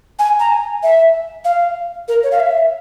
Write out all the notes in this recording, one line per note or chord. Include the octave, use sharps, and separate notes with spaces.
G#5
A#5
G#5
E5
F5
A#4
C#5
F5
E5